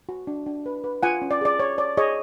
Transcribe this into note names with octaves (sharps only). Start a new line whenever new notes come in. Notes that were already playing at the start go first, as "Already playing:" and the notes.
F#4
D4
D4
B4
B4
F4 F#5 G#5
C#4
D5
G#4 D5
C#5
C#5 D5
G#4 C#5 D#5